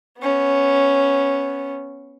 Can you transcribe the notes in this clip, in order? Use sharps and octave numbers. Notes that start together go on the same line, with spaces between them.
B3 C#4